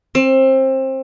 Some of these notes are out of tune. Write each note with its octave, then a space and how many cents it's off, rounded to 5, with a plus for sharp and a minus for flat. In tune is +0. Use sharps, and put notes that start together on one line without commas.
C4 +25